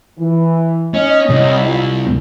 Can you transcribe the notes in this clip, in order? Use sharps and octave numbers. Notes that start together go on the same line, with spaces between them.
E3
C#4 D#4 C#5 D#5
C2
F4